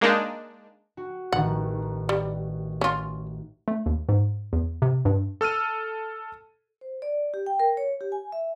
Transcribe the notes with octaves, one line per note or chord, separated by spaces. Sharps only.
G#3 A#3 D4 D#4
F#4
A1 D#3 F#5
G3
C#4 F4
A3
D#2
G#2
E2
C3
G2
A4 E6 F6 D#7
C5
D5
G4
G5
A#4
C#5
G4
G#5
E5